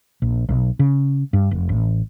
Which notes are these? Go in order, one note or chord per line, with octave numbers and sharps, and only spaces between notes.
A#1
B1
C#3
G2
F1
A1